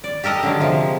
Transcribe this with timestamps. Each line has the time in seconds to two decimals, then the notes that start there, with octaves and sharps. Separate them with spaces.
0.04 D5
0.23 G4 A4 A#4 D#5
0.43 D3 F#3 G#3
0.61 C3 F3